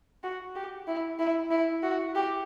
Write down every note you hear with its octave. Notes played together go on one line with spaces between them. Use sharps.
F#4
G4
E4
E4
E4
F#4
G4